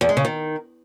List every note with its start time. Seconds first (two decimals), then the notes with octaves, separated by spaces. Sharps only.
0.01 E2
0.09 G#3
0.17 C#3
0.25 D#3